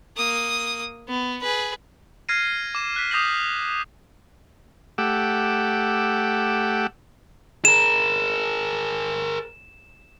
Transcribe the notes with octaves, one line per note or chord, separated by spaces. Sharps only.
A#3 D#6
B3
G#4 B4
F6 G#6 A#6 C7 D#7
D6 E7
F#6 B6
D6 D#6 G6 A#6 C7 F#7
A3 G4 F#5 D6 E6
G#4 A#4 E7